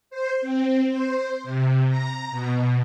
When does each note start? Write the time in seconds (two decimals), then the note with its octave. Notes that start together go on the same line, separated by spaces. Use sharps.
0.10 C5
0.41 C4
0.88 C5
1.44 C3
1.88 A#5
2.31 B2